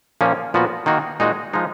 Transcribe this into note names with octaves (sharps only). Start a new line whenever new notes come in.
A#2 F3 A#3 C#4
A#2 F3 B3 F#4
D#3 A#3 D#4 F#4
A#2 G#3 D#4 F#4
F3 G#3 D#4